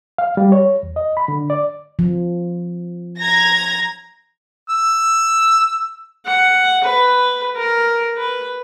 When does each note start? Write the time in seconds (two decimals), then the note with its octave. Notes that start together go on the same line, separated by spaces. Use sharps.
0.18 F5
0.37 G3
0.52 C#5
0.83 E2
0.96 D#5
1.17 B5
1.28 D3
1.50 D5
1.99 F3
3.19 A#5 G#6 A#6
4.69 E6
6.26 F#5
6.83 B4
7.56 A#4
8.16 B4